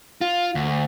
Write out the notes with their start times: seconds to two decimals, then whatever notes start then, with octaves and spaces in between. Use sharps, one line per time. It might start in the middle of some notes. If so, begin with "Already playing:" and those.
0.21 F4
0.55 D2